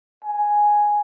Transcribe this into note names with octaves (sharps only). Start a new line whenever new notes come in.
G#5